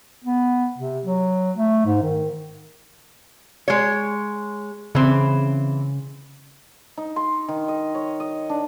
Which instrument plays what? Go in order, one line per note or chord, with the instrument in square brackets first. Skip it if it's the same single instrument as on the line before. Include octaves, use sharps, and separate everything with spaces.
[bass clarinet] B3
C3
F#3
A3
G#2
D#3
[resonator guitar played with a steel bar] G#3 C#5
[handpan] C#3 [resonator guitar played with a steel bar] E3 C4
[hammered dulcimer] D#4
C6
D#3
D#5
C#5
D#5
D4